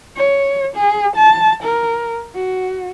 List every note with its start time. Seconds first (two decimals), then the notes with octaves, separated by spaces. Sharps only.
0.16 C#5
0.76 G#4
1.16 A5
1.63 A#4
2.35 F#4